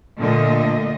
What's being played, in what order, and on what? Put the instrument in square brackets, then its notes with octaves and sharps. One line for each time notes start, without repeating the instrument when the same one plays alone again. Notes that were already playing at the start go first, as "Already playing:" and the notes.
[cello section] A#2 D3 A3 D#5